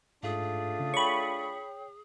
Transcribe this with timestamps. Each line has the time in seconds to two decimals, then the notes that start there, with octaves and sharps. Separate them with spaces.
0.23 G#2 A3 D4 F4 G#4
0.80 C#3
0.94 C#5 G5 B5 C#6